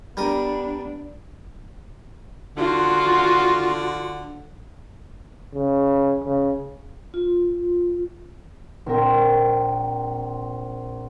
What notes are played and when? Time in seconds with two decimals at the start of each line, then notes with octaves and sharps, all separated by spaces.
0.17 G3 B3 D4 A#4 D#6
2.57 D3 F4 F#4
5.55 C#3
6.24 C#3
7.14 F4
8.86 A#1 C4 A#4 G5